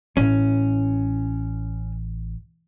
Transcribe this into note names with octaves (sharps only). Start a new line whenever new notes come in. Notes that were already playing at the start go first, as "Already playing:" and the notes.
A1 C#4